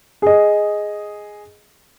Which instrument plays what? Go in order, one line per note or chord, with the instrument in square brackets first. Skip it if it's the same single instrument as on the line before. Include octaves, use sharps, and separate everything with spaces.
[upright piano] G#4 D#5